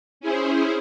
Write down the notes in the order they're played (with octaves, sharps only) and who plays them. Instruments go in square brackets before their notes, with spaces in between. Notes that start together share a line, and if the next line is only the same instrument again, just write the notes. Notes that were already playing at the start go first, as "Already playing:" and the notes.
[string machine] C#4 E4 G#4 C5